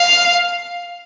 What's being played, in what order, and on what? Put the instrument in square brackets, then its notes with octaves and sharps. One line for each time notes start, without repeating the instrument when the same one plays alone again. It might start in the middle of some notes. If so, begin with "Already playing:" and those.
Already playing: [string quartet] F5